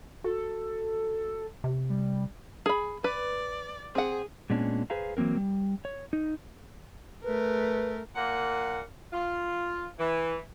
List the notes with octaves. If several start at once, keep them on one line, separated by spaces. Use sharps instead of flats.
F#4 A4
C3
G3
G#4 B5
B4 D5
C4 G#4 F#5
A#2 G#3 B3 C#4 D4
G#4 B4 C5 F5 A#5
E3 F#3 A#3 C4 A#4
G3
C#5
D#4
A3 A#4 B4
A#2 A#3 F#5
F4
E3